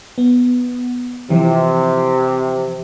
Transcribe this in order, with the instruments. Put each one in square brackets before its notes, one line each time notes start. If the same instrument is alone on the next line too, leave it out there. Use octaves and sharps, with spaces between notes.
[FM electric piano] B3
[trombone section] C3 [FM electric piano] E3 F3